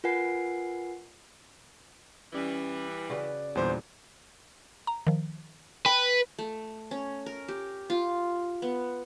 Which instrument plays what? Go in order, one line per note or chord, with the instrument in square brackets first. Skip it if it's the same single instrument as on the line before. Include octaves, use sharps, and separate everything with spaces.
[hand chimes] F4 A#4 B4 F#5 G#5 C7
[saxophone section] E3 G3 [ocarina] C#4
[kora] C#3 F#4 B4 [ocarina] D5
[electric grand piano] E2 C5 [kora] A#2 D3 G3
[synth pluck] A#5
D#3 F3
[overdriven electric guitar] B4 [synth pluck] G5
[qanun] A3
C#4
A#4
G4
F4
B3